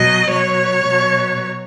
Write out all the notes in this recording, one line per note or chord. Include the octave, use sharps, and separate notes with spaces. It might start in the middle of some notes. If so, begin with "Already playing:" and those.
Already playing: B2 F#3 D#5
B2 F#3 C#5
B2 F#3